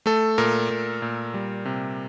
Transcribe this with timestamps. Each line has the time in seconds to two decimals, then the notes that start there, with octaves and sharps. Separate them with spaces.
0.06 A3 A4
0.38 A#2 A#4
0.70 A#2
1.02 A#2
1.34 G3
1.65 C3